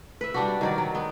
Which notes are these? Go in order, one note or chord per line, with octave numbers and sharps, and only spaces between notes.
B4 E5
G3 D4 F#4
D#3 F#3 D5
F#3
B3